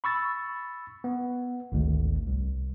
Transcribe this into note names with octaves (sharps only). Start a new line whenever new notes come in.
B5 C#6 E6 A6
B3
G#1 D2
C2